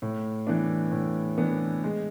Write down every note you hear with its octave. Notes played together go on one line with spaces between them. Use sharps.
A2
E3 B3 D4
A2
E3 B3 D4
G#3